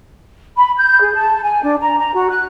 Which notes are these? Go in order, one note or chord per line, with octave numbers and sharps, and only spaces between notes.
B5
G6
G#4
A5
G#5
D4
A#5
A#5
F#4
F#6